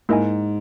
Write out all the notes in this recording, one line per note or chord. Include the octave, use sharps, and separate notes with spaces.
G#2 A#3 E4 A#4 D#5 G#5